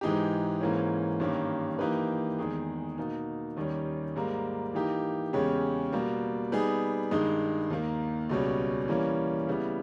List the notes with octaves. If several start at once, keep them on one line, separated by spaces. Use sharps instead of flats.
G#2 E3 G#3 D#4 G4
G#2 E3 A#3 C#4
G2 D#3 A#3 C#4 G4
E3 A#3 D#4 G4 B4
E2 D#3 G#3 D#4 G#4
B2 A#3 D#4
D#2 D#3 G3 C#4
G#2 G3 A#3
E3 A#3 D#4 G4
E2 C#3 G#3 C#4 G4
B2 G3 A#3
G3 B3 D#4 G#4
G2 D#3 G#3 D#4
D#2 D#3 A#3
C#2 B2 G3 C#4
E3 G3 A#3 C#4
C#3 G3 B3 E4